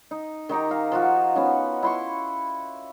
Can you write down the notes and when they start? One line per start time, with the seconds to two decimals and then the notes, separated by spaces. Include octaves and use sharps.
0.11 D#4
0.49 D#3 D#4 G4 A#5
0.71 F5
0.92 F3 F4 F#4
1.35 B3 C#4 D#4
1.83 E4 C6 C#6